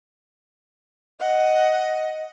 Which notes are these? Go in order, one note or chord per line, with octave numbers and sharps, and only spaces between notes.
D#5 F#5